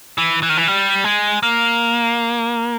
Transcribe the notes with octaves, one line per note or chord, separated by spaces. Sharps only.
E3
E3
D#3
E3
G3
G#3
A#3